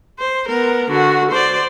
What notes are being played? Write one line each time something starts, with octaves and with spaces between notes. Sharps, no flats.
C5
B3 A#4
D3 F#4
C5 D5